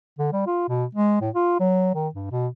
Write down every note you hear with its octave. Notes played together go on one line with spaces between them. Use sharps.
D3
G3
F4
B2
G#3
A2
F4
F#3
D#3
G2
B2